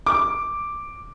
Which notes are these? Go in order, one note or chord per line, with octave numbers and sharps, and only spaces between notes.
D6